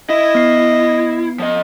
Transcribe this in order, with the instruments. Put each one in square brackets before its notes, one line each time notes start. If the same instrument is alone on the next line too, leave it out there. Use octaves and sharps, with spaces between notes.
[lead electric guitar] E4 [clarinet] D#5
[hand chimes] B3 C7
[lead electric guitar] F3 D#5